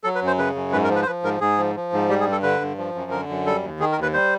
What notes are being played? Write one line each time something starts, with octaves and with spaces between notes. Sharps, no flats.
F#3 A4
B4
F#2
C5
C#3 B4
F#2
G#2 B4
A#4
F3
B4
C5
F3 B4
G#2 A#4
G#2 G#4
F3
F3
G#2
G3 G4
G#4
G2
A4
D3 B4
G2
F3
F#2
D3 A#4
F#2
G3 A4
D#2
D#3 G#4
A#4
D#2
B4
G3 C5